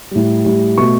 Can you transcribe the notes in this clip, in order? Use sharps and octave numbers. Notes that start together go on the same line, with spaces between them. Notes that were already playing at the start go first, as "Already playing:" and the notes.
A2 G3
A2 G3
B2 A3 C#6